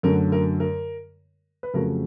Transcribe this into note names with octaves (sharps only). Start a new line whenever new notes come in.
F#2 D3 F#3 A3 A#4
A#4
A#4
B4
F2 C#3 F#3 A3 A#4